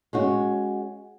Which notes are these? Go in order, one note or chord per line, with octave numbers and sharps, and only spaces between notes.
G#3 C#4 F#4